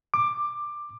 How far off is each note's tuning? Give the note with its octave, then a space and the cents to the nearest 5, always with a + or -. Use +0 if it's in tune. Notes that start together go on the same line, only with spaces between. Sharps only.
D6 +15